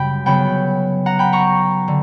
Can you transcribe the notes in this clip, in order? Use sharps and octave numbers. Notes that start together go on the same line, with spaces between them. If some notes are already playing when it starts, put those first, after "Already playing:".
Already playing: F#2 C#3 G3 G5 B5
C#3 F#3 B3 G5 B5
F#5 A#5
G5 B5
A#5 C#6
D3